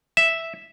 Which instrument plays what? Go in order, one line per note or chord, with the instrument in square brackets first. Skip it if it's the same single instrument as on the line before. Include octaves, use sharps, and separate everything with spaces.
[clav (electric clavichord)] E5